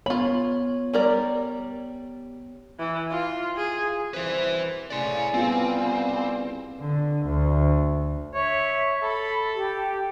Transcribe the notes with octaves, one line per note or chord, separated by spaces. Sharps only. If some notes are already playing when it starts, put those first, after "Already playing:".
B3 F4 C#5 B5
G3 A#4 D5
E3
F4
G#4
C2 F#2 B4 C5 E5
A2 C#3 D5 G#5 C6
C2 C#3 G3 B3 C4 F4
D3
D2
C#5 E5
A4 B5
G4